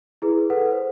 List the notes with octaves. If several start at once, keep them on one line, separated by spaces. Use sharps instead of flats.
E4 G#4 B4
A4 B4 F#5
C5